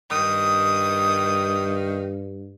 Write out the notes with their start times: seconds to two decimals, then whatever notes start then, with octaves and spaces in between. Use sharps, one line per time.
0.11 G2 D#3 D#6